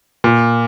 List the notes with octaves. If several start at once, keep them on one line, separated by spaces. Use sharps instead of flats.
A#2